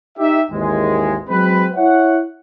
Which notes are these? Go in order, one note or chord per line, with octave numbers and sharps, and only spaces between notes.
D#4 G4 E5
G#1 D#2 E3 G#3
F#3 G#3 C4 B4
E4 C#5 E5 F#5